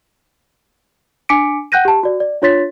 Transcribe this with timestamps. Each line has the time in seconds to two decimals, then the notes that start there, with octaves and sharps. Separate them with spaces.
1.29 D4 G#5 D6 B6 C#7 D7
1.72 F#5 G5 F#6 G6 A#6 D#7
1.85 G4 A5
2.03 F#4 D5
2.20 D5
2.42 D4 F4 C#5 C6 A6 B6